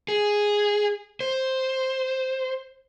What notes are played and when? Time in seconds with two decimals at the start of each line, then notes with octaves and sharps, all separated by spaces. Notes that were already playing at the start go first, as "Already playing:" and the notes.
0.08 G#4
1.21 C5